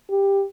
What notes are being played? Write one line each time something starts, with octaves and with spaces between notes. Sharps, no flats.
G4